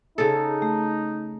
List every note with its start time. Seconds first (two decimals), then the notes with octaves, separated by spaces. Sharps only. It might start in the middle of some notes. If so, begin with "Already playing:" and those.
0.18 C#3 D#4 A4
0.62 A3